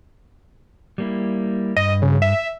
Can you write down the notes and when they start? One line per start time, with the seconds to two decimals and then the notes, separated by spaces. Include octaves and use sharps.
0.98 G3 A#3 E4
1.76 G2 D#5
2.02 C#3
2.22 E5